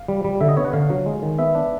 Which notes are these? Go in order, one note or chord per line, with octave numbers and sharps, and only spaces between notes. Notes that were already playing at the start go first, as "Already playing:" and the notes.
Already playing: F5
G3
G3
D3 E5
D#5
B3 C#5
F#5
D3 F5
F#3
G#3
D#3
B3 E5
D4